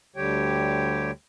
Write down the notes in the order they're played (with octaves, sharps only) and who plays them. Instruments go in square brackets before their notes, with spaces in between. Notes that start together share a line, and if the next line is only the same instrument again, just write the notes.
[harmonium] D2 D3 G3 G4 C#5 G5